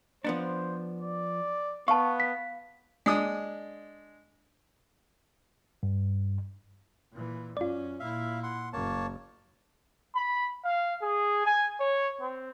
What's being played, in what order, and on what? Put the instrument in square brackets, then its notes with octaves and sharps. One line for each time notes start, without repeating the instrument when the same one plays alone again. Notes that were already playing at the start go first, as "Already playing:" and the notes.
[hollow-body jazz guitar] F3 B3 D4 [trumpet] C5
[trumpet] D5
[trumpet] B3 [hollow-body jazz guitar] F5 [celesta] A5 C#6
[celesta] B6
[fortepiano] G#3 D4 D#6
[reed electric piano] G2
[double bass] A#2 E3
[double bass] F#2 C#4 [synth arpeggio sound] F4 D5
[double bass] A#2 E4 [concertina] E5 F5
[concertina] F#5 C6
[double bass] F#1 [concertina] A#3 C#5 A5
[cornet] B5
F5
G#4
G#5
C#5
C4